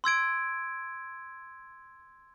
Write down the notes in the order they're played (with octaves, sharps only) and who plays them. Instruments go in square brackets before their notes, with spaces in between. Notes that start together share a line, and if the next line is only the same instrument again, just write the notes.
[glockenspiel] C6 E6 G#6 D7